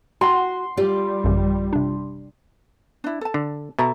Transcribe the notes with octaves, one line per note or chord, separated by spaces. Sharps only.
F#4 G5 C6
G3 F4 G4 D5
A1 F#2 C#3
C3 D4
D4 E4
A4 A5
D3
B2 A4 E5 A#5